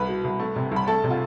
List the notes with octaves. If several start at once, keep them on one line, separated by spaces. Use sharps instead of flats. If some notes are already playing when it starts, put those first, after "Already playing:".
Already playing: C2 B4 B5
B2
C2
A3
C3
C2 B5
A3 A4 A5
C3
F4